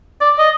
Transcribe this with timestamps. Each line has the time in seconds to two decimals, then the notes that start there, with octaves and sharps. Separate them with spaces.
0.21 D5
0.39 D#5